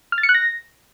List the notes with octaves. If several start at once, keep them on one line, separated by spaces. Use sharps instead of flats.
F6
A6
C#7
F#6
A#6